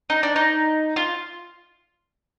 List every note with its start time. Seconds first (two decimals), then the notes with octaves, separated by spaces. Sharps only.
0.10 D#4
0.23 D4
0.36 D#4
0.96 F4